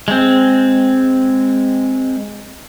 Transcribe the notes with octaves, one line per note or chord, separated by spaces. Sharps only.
G#3 C4